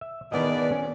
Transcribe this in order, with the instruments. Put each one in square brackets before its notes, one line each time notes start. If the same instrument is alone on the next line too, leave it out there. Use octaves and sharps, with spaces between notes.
[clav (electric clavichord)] E5
[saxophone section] E2 B2 D5 [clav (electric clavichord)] D#3 B3 D#5
[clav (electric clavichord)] C#4